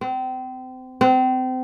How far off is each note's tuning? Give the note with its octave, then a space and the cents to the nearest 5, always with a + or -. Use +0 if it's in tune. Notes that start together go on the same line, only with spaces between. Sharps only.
C4 -30
C4 -30